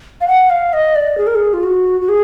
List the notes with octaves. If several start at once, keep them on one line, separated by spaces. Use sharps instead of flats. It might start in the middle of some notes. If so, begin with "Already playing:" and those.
F5
F#5
F5
D#5
D5
G#4
A#4
G#4
F4
F#4
F#4
G#4